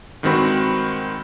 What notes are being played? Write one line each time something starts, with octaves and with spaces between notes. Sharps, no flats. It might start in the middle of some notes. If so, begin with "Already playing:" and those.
G2 D#3 G#3 C4 F#4 B5